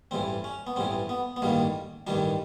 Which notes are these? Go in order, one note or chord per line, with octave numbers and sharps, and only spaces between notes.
A1 G2 E3 C4
C#4
B3
A1 G2 E3 C4
B3
B3
A1 G2 D#3 G3 A#3
A1 G2 D#3 G3 D4